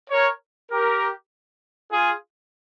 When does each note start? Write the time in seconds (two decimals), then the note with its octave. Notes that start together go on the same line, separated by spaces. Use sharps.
0.10 A#4 C#5
0.71 G4 A#4
1.92 F4 G#4